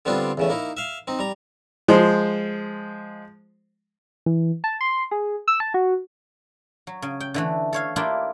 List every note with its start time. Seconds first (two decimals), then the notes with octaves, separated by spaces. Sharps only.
0.05 D3 G3 B3 C4 D4 F4
0.37 E2 C#3 A3
0.49 A#3 D#4 E4
0.77 E5 F5
1.08 C4 D#4
1.19 G3 A#5
1.88 F3 G#3 C5
4.26 E3
4.64 A5
4.81 C6
5.11 G#4
5.48 E6
5.60 A5
5.74 F#4
6.87 F#3
7.02 C#3
7.20 G5
7.34 D3 E3 A3
7.73 A4 C#5 F5
7.96 A#3 D4 E4 F4 G4 G5